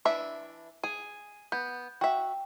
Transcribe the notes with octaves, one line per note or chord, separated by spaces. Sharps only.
E3 D4 E5
G#4 D#7
B3 G6
F#4 E5 G5